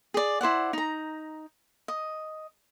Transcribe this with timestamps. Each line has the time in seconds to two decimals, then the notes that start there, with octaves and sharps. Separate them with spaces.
0.14 G#4 D5
0.41 E4 C5 D5 F#5
0.73 D#4 A#5
1.88 D#5